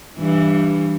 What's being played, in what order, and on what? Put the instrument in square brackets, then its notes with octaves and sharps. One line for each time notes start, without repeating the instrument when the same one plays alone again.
[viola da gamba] G2 E3